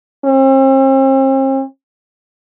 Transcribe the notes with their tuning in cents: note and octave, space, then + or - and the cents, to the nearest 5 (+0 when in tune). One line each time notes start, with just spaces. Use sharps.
C4 +40